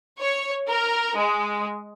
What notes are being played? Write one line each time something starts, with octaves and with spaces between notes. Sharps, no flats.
C#5
A#4
G#3